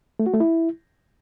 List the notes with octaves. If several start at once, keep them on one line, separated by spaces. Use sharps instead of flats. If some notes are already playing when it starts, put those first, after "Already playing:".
A3
F#4
A3
E4